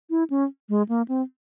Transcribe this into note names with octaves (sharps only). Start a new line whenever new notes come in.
E4
C#4
G#3
A#3
C4